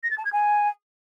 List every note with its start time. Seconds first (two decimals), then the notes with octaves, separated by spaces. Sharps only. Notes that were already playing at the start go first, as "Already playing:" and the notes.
0.03 A#6
0.11 A6
0.18 A5
0.25 G#6
0.33 G#5